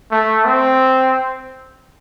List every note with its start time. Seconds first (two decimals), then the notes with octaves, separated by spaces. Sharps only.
0.12 A3
0.46 C4